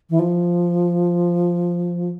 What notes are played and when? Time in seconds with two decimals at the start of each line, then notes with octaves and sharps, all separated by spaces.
0.10 E3
0.19 F3